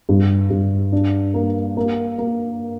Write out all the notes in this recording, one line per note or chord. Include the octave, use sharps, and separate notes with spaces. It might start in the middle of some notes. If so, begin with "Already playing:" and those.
G2
G2
D4
A#3
A#3
A#3